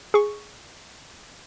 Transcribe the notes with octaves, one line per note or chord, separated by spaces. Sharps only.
G#4 C#6